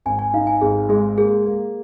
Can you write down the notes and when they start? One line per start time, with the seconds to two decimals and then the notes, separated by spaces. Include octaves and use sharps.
0.06 G#1 G#5
0.19 G#5
0.34 D#4 F5
0.47 G#5
0.61 G#1 G#4
0.89 G#3 G#4
1.17 A#3 G#4
1.45 A#3